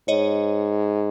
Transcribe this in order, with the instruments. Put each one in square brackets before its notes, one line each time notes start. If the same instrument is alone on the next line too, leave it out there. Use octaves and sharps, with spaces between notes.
[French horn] G#2 [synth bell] C#5 D#5